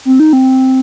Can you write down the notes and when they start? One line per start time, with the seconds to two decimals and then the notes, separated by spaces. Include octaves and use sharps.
0.05 C4
0.20 D#4
0.33 C4